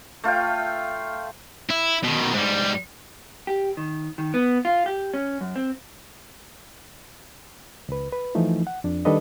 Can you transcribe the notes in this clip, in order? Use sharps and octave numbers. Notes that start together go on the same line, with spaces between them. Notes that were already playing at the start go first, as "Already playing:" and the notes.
A3 F4 F5 G5
E4
B2 D#3
G#2 G3
G4
D#3
D#3
B3
F4
G4
C#4
F#2
C4
C#2 B4
B4
E3 F3 A3 D#4
F#5
F2 D4
D#3 G3 D4 A4 B4 D#5